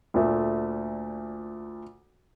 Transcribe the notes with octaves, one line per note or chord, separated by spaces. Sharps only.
D2 A#2 A3